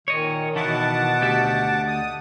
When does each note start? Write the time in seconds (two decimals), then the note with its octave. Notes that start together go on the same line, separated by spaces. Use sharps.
0.08 A#2 D#3 C#5 D#5
0.55 B2 D#3 E3 E4 F#5 A5 D6
1.21 D2 G4 E5
1.87 D#6